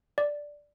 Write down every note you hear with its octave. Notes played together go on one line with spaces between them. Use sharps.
D5